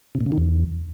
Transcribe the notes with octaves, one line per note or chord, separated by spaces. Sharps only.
C3
A#2
C#3
D#3
E2